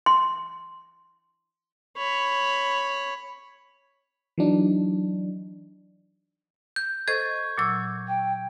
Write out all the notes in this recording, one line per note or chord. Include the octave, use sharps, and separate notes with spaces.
C6
C#5 B5
E3 F#3 D4 D#4
G6
A4 C5 D#5 C#6 G#6
A#2 F#3 E6
G5